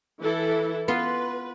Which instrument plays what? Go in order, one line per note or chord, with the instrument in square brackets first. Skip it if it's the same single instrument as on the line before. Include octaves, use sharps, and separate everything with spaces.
[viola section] E3 E4 A4
[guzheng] B3 F4 C6 [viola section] B4